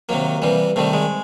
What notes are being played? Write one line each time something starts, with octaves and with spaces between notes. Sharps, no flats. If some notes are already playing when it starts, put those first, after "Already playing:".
C3 D#3 F#3 A#3
C3 E3 G3
C3 D#3 G3 A3
G#3